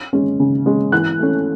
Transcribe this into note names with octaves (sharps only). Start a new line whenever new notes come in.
G#3 C#4
C#3
G#3 C#4
E3 F#6
A3 C#4